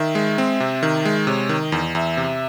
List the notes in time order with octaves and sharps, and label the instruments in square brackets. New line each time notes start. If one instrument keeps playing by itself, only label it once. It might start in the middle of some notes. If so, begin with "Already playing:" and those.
Already playing: [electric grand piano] D#3 [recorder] E5
[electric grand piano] G#3
C4
C3
D#3
G#3
[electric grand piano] C3 [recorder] C#5
[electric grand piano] D#3
[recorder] D#5
[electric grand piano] E2
[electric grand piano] E2 [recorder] E5
[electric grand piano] C3